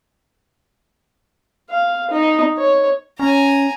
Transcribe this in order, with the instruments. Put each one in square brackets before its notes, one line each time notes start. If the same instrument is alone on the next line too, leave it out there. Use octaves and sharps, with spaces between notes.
[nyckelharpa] F5
D#4
C#5
[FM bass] C#4 [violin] G#5 A#5